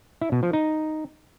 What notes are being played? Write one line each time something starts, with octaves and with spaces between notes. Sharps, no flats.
E4
B2
F3
D#4